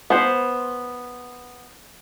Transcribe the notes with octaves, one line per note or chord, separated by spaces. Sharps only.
B3 C5